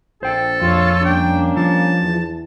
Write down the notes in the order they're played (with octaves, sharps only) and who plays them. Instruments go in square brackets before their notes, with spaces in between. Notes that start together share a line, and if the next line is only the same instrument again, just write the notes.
[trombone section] A#1 [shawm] A4 [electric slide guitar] C5 G5
[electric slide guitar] F2 [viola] F4 C#5
[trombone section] G3 A#3 C#4 [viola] D4 [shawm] G5
[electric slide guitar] F3 [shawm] A5
[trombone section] E2